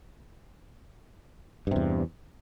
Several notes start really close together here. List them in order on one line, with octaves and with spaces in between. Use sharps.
G2 C3 E2